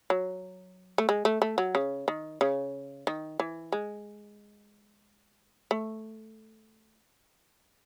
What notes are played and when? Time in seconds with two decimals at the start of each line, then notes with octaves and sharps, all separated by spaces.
0.10 F#3
0.98 A3
1.09 G#3
1.25 A3
1.42 A3
1.58 F#3
1.75 C#3
2.08 D#3
2.41 C#3
3.07 D#3
3.40 E3
3.72 G#3
5.71 A3